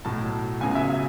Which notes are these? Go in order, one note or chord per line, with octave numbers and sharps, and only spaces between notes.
B1 A2 F#3 A5
C#2 C#3 F#3 B3 G#5
E5
E5